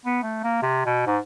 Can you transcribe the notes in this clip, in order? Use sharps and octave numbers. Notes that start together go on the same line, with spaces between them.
B3
A3
A#3
C3
B2
G#2